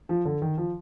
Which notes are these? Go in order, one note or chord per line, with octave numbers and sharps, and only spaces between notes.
F3
D3
D#3
F3